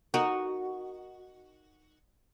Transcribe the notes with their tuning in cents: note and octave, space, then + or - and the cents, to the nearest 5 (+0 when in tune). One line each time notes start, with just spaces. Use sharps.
D#4 -10 F#4 +0 A#4 +0